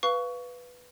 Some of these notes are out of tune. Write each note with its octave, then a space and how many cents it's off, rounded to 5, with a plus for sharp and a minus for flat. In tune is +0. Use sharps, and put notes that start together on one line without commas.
B4 +0 F5 +0 C#6 +20